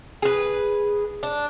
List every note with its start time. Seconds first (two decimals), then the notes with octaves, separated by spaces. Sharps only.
0.22 G#4 B4
1.23 D4